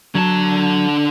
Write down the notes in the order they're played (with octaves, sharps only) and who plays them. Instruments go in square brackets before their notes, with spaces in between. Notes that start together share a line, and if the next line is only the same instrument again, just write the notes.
[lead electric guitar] D3 A5 [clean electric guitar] F#3